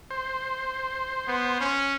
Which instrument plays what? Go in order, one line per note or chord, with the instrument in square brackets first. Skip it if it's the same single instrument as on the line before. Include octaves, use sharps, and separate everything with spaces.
[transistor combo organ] C5
[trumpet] B3
C#4